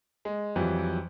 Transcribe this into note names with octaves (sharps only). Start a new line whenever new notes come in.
G#3
F2 E3 F#3 G3